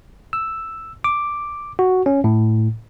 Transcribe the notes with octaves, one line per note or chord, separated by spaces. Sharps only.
E6
D6
F#4
C#4
A2